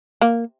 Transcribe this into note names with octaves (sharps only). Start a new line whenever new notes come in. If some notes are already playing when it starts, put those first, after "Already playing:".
A#3